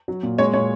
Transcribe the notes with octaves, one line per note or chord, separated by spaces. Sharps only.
F#3
A#2
G#3 C#5
A#2 C#5